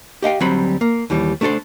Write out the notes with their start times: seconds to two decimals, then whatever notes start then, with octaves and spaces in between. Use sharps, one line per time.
0.22 G4 D#5 F5 G5
0.40 D2 F#3 G3 C4 B5
0.81 A#3
1.10 D#2 E3 G3
1.41 A3 D4 G4 A4 C5